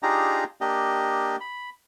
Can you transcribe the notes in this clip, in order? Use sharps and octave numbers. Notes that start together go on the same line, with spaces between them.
D4 D#4 F4 G4 G#4 A#5
A#3 D4 G4 D#5
B5